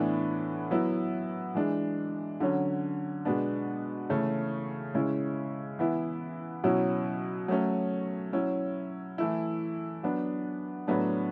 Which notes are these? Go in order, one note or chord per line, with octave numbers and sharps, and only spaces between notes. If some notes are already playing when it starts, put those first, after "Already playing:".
Already playing: A2 E3 B3 D4
F#3 B3 E4
E3 G#3 D4
D3 F#3 C#4
B2 G#3 B3 D4
C#3 E3 A3 C#4
C#3 G#3 C#4 E4
E3 B3 E4
B2 F#3 C#4 E4
F#3 A3 C#4
F#3 C#4 E4
E3 A3 E4
F#3 B3 D4
A2 F#3 B3 D4